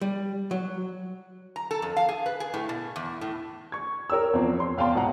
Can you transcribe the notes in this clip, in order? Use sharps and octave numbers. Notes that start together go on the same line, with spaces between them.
G3
F#3
A#5
A4
F2
F5
G#4
B4
G#4
A2
B2
E2
A2
C#6 G#6
A#4 C#5 G5 E6
E2 F3 C4
C#5 C6
E2 F5 G5 A5 C6
B1 G#2 D#5 F#5 A#5